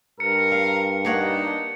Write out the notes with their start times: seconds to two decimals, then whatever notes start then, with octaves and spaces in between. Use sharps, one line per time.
0.20 G2 A#4 C#7
0.52 F5
1.05 A#3 D4 D#4 C#5 F#5